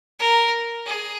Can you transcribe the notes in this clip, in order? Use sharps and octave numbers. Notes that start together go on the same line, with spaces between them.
A#4
G#4